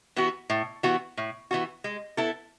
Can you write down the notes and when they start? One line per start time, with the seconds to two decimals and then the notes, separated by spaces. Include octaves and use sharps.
0.16 E3 B3 F#4
0.50 A2
0.83 E3 B3 F#4
1.17 A2
1.51 E3 B3 F#4
1.84 G#3
2.17 B3 E4 A4